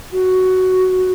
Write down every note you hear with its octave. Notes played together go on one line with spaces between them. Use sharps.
F#4